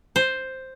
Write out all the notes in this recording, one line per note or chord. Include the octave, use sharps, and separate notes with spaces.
C5